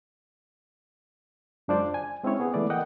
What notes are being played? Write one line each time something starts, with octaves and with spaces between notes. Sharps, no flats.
F#2 G#3 D4 F4 C5 D5
G#5
G#3 C4 C#4 E4 C#5
B3 G#4
E3 G#3 A3 B4 D5
A#3 D#5 F#5 G5